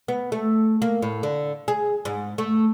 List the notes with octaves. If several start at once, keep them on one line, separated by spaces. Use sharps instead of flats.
B3
A3
A#3
A2
D3
G#4
G#2
A3